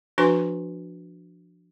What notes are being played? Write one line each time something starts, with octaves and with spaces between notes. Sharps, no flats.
F3 D4 F#4 B4 G#5 C6